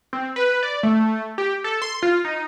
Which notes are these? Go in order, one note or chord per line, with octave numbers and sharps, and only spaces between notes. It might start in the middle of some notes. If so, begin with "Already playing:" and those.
C4
B4
D5
A3
G4
A4
C6
F4
D#4